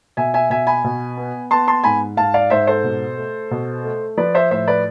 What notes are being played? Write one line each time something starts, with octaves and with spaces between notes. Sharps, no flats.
B2 E5 G#5
E5 G#5
B2 E5 G#5
G#5 B5
B2
B3
B3 A5 C6
A5 C6
G#2 G#5 B5
G#2 F5 A5
D5 F5
G#2 C5 E5
A4 C5
B2
A3
B2
A3
F3 B4 D5
C5 E5
A2 C5 E5
B4 D5